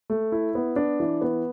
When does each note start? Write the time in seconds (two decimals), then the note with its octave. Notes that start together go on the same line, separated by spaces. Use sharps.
0.10 A3
0.32 E4
0.55 B3
0.76 D4
1.00 E3
1.21 B3